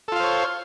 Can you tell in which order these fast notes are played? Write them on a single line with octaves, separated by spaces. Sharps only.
A4 F4 F5 C5 C#5